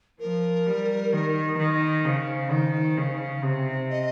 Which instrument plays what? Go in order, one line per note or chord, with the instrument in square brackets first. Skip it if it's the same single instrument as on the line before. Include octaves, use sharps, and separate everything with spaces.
[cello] F3 [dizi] A#4
[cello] G3
D#3
D#3
[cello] C#3 [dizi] C5
[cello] D#3
C#3
C3
[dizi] D#5